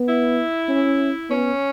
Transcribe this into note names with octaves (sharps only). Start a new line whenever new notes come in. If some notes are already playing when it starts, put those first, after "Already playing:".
Already playing: B3
E4
C#4
B3 C#4